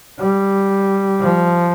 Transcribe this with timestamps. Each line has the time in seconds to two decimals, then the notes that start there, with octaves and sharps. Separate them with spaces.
0.19 G3
1.20 F3